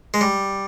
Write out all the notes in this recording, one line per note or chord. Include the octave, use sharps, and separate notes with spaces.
G#3
G3